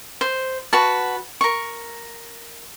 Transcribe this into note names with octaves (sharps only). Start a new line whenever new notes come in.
C5
F#4 B4 A5
A#4 C#6